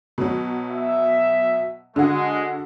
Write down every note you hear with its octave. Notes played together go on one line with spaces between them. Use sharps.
B2 F#3
E5
D3 G#3 F#4